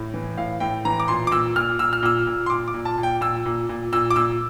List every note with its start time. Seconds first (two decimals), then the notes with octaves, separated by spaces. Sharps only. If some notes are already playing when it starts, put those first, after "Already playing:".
Already playing: A2
0.14 E3
0.37 A2 F5
0.60 A2 G5
0.85 E3 A#5
1.00 D6
1.08 A#2 C6
1.27 D6
1.31 A#2 E6
1.56 A#2 F6
1.79 A#2 E6
1.93 F6
2.02 A#2 E6
2.27 A#2
2.46 C6
2.50 A#2 D6
2.68 D6
2.74 A#2
2.85 A5
2.98 A#2
3.03 G5
3.21 A#2 E6
3.45 A#2
3.69 A#2
3.92 A#2 E6
4.11 D6
4.16 A#2 E6